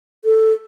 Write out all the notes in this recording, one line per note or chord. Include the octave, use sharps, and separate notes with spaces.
A4